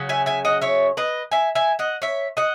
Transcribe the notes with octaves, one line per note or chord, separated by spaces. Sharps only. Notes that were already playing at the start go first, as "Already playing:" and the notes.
Already playing: C#3 F#3
E5 G#5
E5 G#5
D#5 F#5
C#5 E5
B4 D#5
E5 G#5
E5 G#5
D#5 F#5
C#5 E5
D#5 F#5